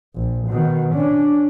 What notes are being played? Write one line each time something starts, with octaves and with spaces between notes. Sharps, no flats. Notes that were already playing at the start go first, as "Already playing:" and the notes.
A#1
B2 D#3
C#4 D4